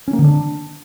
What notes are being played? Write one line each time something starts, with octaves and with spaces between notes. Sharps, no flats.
C#4
A#3
D3
D4